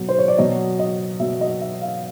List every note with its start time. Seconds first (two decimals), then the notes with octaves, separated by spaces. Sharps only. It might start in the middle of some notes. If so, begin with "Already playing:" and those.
Already playing: B2 F#3
0.09 C5
0.18 C#5
0.28 D5
0.38 B2 F#3 D#5
0.79 D#5
1.19 B2 E5
1.22 F#3
1.41 D#5
1.61 E5
1.82 F5